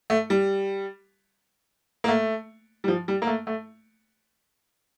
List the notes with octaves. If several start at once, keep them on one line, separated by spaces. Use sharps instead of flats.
A3
G3
A#3
A3
G3
F3
G3
A#3
A3
A3